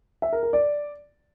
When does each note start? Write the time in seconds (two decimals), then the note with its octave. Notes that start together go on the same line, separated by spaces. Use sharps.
0.22 E5
0.33 A#4
0.43 A#4
0.53 D5